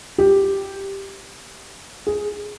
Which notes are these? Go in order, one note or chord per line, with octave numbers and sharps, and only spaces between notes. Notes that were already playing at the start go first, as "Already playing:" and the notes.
G4
G#4